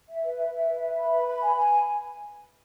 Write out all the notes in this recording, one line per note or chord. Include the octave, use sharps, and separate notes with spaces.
E5
B4
E5
E5
B4
E5
B5
B4
B5
G#5
G#5